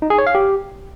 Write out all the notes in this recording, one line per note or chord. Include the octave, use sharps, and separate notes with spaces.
D#4
G#4
C#5
F5
G4